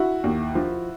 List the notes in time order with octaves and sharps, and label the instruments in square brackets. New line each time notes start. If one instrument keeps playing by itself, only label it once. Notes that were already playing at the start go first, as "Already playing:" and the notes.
Already playing: [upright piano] E4 F#4
D#2
F3